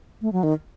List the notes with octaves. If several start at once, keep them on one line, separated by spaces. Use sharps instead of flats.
A3
F#3
D#3